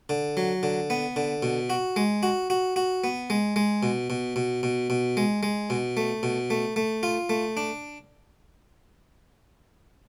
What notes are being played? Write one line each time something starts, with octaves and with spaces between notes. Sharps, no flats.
D3
F#3
D3
B3
D3
B2
F#4
G#3
F#4
F#4
F#4
B3
G#3
G#3
B2
B2
B2
B2
B2
G#3
G#3
B2
A3
B2
A3
A3
F4
A3
D4